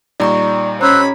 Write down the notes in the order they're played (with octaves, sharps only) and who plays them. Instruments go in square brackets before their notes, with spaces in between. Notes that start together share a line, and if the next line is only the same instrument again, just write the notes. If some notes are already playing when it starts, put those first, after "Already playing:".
[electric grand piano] A#2 G3 D#4 [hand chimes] D5 A#5 C#6
[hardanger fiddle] C#4 B5 [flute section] C5 E6 F#6 [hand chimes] A#5